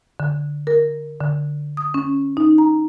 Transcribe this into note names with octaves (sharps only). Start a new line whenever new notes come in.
D3
A#4
D3
D#6
C#4
D#4
A#5